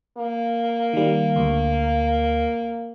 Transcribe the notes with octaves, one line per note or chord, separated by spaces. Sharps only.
A#3
D#3 G3
D2